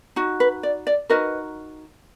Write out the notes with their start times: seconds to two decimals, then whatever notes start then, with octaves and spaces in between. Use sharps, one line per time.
0.16 D#4 F#4
0.40 B4
0.63 D5
0.87 D5
1.09 D#4 F#4 A#4 B4 D#5